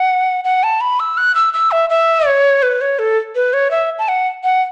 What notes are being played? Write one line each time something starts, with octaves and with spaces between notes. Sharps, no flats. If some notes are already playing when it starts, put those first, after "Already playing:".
Already playing: F#5
F#5
A5
B5
E6
F#6
E6
E6
E5
E5
C#5
B4
C#5
A4
B4
C#5
E5
A5
F#5
F#5